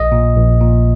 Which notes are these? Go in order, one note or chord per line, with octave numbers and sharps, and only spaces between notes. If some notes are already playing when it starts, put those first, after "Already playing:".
Already playing: A#1 D#5
A#2
A#1
A#2